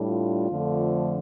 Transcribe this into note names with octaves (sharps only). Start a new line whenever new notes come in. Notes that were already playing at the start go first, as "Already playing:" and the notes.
Already playing: A2 G3 D4
F4
F2 D3 F3 A3 D4